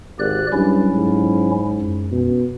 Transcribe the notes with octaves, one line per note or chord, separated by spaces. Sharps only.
G#1 G4 D5 F#6
G2 F#3 C#4 E4
G#2
F#2
B2